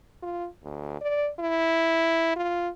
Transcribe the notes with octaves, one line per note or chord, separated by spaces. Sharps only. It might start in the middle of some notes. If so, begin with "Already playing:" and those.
F4
D2
D5
E4
F4